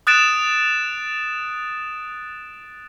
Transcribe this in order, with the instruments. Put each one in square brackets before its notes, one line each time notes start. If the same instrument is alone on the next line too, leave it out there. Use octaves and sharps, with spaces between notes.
[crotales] D#6 F#6 A6 D7 E7